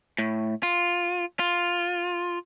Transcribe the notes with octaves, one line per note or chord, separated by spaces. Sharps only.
A2
F4
F4